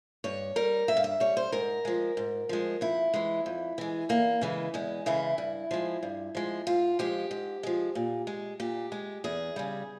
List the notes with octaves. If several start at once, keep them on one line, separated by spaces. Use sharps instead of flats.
G2 C#5
G3 A#4
G2 E5
F5
E5
G3 C#5
C5
G#2 A#4
F3 G#3
G#2
F3 G#3
F2 E4
E3 G#3
F2
E3 G#3
E2 A#3
C#3 E3 G#3
E2 G#3
C#3 E3 G#3 E4
G2
F3 G#3
G2
F3 G#3
G#2 F4
F3 G#3 G4
G#2
F3 G#3
A#2
G#3
A#2 G4
G#3
E2 G#4
C#3 G3